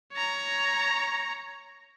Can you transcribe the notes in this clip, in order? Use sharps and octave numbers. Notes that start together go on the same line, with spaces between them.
C#5 A#5